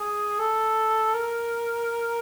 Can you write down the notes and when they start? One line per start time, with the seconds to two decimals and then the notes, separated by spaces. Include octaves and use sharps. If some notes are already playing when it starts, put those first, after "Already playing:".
Already playing: G#4
0.39 A4
1.15 A#4